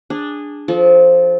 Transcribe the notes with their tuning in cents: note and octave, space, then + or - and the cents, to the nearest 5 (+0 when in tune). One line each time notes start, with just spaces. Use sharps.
D4 +0 G#4 -15
F3 +0 A4 -35